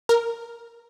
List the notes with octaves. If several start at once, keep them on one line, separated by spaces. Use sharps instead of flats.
A#4